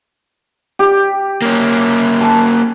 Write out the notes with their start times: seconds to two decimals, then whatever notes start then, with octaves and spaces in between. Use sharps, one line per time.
0.79 G4
1.42 A#3 C#4
2.21 G#5 A5